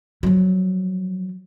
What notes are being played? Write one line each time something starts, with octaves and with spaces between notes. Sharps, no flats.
F3 F#3